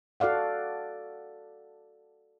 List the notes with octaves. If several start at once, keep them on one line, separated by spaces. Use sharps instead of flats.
F#4 A4 D5 F5 F#5